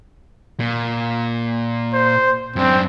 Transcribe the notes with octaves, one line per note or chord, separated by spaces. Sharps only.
A#2
C5
F#2 C4 D4